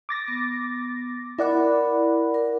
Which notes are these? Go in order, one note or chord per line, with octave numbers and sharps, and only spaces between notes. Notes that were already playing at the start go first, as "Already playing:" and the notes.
D6 A6 A#6
B3
E4 A#4 D5 F#5 B5
A#4